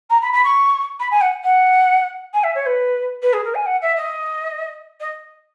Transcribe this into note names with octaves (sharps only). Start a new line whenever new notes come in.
A#5
B5
B5
C#6
B5
G#5
F#5
F#5
G#5
E5
C#5
B4
B4
G#4
A#4
G#5
F#5
E5
D#5
D#5